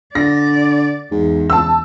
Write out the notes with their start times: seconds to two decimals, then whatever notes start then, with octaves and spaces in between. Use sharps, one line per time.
0.15 D3 D5 A#6
1.12 E2 G#2
1.50 C#2 A5 E6